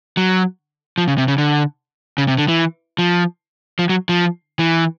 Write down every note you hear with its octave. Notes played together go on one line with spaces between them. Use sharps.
F#3
F3
C#3
C3
C#3
D3
C#3
C3
D3
E3
F3
F3
F#3
F3
E3